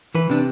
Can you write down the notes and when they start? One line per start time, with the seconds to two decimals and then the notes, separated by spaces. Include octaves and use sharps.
0.15 E3 B4
0.30 C3 D4